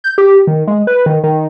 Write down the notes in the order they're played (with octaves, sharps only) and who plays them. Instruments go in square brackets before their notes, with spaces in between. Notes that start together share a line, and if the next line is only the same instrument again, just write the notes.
[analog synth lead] G6
G4
D#3
G#3
B4
D#3
D#3